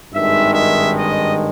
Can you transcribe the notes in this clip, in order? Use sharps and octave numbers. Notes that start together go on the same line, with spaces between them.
G#1 G2 D#3 G#3 E5
E5
D#5